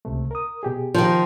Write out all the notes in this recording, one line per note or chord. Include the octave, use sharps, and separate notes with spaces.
C#2 C3 A3
A#4 D#6
B2 G4 G#4
D#3 F3